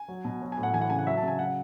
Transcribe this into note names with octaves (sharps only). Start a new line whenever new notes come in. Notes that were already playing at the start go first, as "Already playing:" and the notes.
Already playing: G#5
F#3
B2
F#3
G#5
A2
F#5
E3 G#5
F#5
C#3 G#5
F#5
F#3 E5
A5
C#3 G#5
F#3 F#5